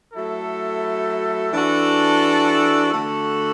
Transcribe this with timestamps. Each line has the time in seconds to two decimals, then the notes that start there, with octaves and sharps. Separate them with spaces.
0.13 F#3 A3 E4 A4
1.52 E3 D4 F#4 A4
2.92 D3 A3 F#4 A4